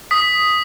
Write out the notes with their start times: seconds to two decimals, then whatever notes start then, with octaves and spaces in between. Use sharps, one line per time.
0.11 D#6 B6